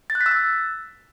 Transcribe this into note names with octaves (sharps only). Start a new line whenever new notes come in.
A6
F#6
B6
E6
A6